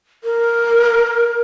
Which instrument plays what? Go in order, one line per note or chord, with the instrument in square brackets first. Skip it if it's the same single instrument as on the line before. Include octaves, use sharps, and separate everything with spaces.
[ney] A#4